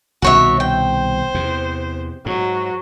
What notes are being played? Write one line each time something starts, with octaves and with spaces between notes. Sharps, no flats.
C2 B2 D#3 F#4 C#5 E5
C5 G5
E2 C3
G#2 F#3